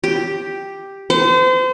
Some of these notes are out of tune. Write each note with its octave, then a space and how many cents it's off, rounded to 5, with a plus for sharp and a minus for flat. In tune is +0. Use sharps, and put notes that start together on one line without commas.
G4 +0
C5 -35